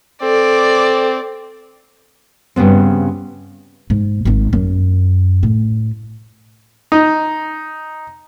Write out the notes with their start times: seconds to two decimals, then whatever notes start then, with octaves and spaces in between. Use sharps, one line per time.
0.22 C4 A4 D5
2.56 G2 C#3 B3 C4
3.90 G#2
4.25 G#1 D#4
4.53 F#2
5.43 A2
6.92 D#4